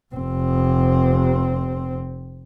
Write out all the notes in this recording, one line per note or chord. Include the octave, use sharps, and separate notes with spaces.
F1 C4